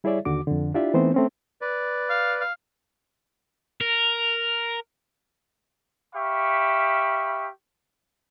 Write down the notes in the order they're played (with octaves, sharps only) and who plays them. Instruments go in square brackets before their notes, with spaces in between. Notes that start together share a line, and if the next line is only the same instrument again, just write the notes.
[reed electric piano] G3 E4 G#4 C#5 D5 E5
D#2 D3 F#4 D6
F2 D3
D4 E4 F4 G4 D5 E5
E3 A3 B3 C4 D#4 C5
A3 C4 C#4
[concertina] B4 D5
[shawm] F5
F5
[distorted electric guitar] A#4
[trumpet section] G4 E5 F5 B5 C#6